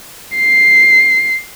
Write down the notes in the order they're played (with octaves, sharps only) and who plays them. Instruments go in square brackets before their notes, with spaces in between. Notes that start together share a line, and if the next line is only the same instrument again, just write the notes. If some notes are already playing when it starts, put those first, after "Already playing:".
[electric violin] C7